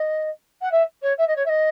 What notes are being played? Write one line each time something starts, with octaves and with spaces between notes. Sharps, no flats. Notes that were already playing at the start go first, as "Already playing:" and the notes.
Already playing: D#5
F#5
E5
C#5
E5
D#5
C#5
E5
D#5